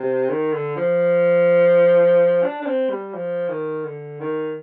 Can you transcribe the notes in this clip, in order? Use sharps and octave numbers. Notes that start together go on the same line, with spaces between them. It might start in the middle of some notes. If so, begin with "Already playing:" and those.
Already playing: C3
D#3
D3
F3
D4
D4
C4
G3
F3
D#3
D3
D#3